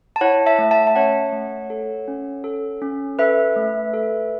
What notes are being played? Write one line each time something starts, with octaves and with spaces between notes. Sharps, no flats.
A5
E4 C#5 F#5
E5 A5
A3
E5 A5
A5
C#4 C#5 F#5
A3
A4
C#4
A4
C#4
A4 B4 E5
A3
A4